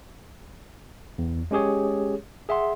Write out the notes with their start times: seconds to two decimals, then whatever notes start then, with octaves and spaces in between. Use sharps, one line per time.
1.18 E2
1.51 G#3 C#4 G4 G#4 C#5
2.49 G#4 E5 F#5 C6